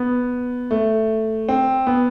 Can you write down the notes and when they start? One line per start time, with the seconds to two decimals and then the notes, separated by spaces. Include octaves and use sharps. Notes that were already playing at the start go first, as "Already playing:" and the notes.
Already playing: B3
0.71 A3
1.49 C4
1.87 B3